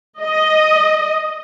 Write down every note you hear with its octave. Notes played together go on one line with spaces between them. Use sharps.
D#5